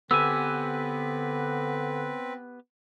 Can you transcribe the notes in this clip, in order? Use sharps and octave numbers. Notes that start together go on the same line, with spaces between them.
D3 B3 C4 G4 B4 G#5 E6